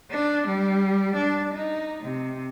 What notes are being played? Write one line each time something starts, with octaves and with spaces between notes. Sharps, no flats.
D4
G3
D4
D#4
C3